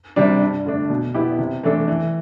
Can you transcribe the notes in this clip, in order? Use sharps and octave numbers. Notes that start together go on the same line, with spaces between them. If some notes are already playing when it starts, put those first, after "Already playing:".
C3 G3 D4
G2
D3 A3 D4
B2
B3 E4 G4
C3
E3 A3 D4 A4
E3